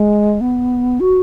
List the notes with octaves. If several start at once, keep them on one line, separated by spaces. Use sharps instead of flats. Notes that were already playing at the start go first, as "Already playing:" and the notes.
Already playing: G#3
B3
F#4